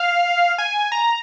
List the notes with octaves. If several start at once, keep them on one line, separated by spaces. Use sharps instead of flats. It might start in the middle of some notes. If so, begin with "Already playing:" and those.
Already playing: F5
G#5
A#5